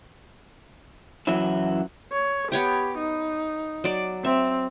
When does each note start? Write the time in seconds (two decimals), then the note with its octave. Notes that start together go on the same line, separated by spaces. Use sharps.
1.27 F#2 E3 F#3 E4
2.13 C#5
2.52 B3 G4 C#5 G5
2.98 D#4
3.84 F#3 D5
4.25 C4 E5